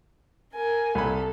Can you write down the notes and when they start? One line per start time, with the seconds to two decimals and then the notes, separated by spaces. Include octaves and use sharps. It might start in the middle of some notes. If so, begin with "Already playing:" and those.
0.54 A#4 G#5
0.95 C2 A4 B5